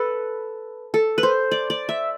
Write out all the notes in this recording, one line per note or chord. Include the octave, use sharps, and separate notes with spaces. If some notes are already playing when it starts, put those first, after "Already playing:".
Already playing: A4 B4
A4
B4
C5
D5
D5
E5